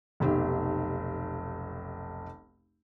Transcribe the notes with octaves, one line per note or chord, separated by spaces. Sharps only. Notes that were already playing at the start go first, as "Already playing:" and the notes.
F1 B1 G4